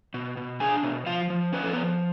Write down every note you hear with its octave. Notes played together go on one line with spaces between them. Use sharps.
B2
B2
D4 G#4 G#5
B2
F3 F4 F5
F3
C#4 B4
A4
F3 B3 B4